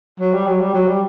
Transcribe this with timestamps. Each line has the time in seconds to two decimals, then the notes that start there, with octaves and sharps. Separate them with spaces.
0.20 F#3
0.33 G3
0.47 F#3
0.61 G3
0.74 F#3
0.88 G3